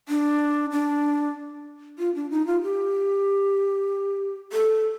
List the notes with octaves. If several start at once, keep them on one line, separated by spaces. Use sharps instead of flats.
D4
D4
F4
D4
D#4
F4
G4
A4